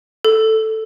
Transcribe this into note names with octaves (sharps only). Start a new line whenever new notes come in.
A4